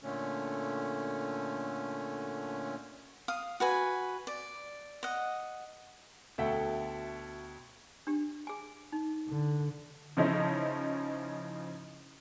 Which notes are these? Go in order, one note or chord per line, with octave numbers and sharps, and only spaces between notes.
A#2 D3 A3 C#4
F5 D#6
F#4 B4 G#5
D5
D#5 F#5
D2 B2 A4 E5 F#5 G5
D4 G4
G#4 G#5
D#4
D3
C#3 F3 C#4 D#4 E4